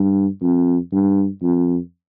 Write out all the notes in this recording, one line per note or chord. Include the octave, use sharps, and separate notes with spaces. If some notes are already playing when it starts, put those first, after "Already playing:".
Already playing: G2
F2
G2
F2